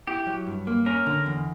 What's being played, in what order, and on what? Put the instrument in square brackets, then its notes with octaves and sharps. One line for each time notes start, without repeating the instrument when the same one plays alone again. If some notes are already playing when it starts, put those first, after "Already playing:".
[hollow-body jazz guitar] E4 [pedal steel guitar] G4
[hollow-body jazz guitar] F#3
G2
A#3
[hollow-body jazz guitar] C#4 [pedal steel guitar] A#4
[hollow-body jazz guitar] D3
E2